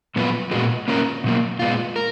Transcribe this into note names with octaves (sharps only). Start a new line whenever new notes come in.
A#2 F#3 B3 F4 B4
A#2 G#3 B3 F#4
A#3 C#4 F4 A#4
B2 F#3 A#3
A#2 G#3 B3 F4
A#4